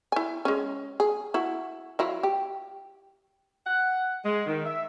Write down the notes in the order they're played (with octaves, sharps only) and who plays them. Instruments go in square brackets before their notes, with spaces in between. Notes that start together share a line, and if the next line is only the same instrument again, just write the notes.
[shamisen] E4 G#5
G#3 C#4
G#4
E4 F#4
F#3 E4 F4
G4
[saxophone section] F#5
G#3
D#3
E5